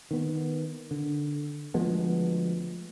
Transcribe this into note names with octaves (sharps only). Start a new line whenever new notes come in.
D#3 B3
D3
D2 F3 G#3 B3